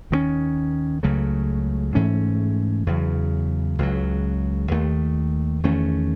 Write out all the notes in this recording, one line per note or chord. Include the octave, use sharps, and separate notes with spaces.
D#2 D#3 A3 C#4
C#2 C#3 F#3 A3
G#2 E3 A3 C#4
E2 C#3 F#3
C#2 C#3 F#3
D#2 D#3 A3
E2 D#3 A3 C#4